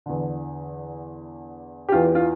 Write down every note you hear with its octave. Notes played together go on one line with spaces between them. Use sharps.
E2 D3
G4
E2 E3 F4
F4